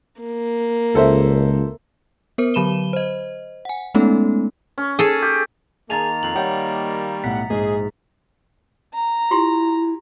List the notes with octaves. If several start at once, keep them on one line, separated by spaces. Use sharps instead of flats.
A#3
C#2 A4 C5 E5
B3 A#4 C5
D3 F#3 B5 D#7 E7 G7
C5 D#5
F#5 G#5
G#3 A3 B3 C#4 D#4 A4
C#4
G#4 A4
G4
D#3 A#3 G#4 A5 A#5 A6 F7
F2 F#7
G3 C#5 F#5 G6
B1 A2 F#5 B6
A#1 G#2 G#3 D#4 G#4
A#5
E4 F4 G4 C6